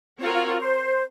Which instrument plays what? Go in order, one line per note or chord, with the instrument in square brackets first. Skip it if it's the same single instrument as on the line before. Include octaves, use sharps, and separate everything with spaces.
[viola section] C4 F#4 A#4 C#5 [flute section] F4
[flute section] F4
F4
C5